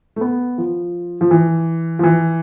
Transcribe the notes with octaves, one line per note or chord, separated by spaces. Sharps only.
A3
B3
F3
F3
E3
F3
E3